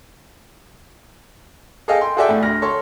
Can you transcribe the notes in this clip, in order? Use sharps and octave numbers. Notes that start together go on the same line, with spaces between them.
G#4 A4 D#5 F5 G5
G5 C6
F#4 G#4 A4 D5 E5 G5
A2 A3
D2 F6 A#6
A4 C#5 C6